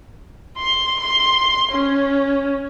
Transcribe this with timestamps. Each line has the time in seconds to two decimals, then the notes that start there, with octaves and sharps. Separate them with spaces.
0.57 C6
1.01 C6
1.71 C#4